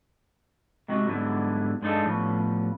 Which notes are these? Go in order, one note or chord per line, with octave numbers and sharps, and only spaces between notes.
C3 G#3 C4 F#4 D#5
G#2 D3 F#3 G3 B3 E4
G2 G#3 D4 D#4 A4
A2 F3 G3 B3 C#4